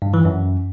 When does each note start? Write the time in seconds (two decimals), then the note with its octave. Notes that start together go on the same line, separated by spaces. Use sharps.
0.02 G2
0.14 E3
0.25 F#2